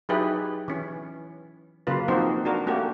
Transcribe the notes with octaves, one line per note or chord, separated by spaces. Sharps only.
F#3 D#4 E4 G4 G#4 B4
E3 C#4
C#3 F#3 A#3 F4 B4
F3 A#3 C4 D#4 F#4 C5
D4 F#4 A#4
A3 A#3 C#4 F#4 G4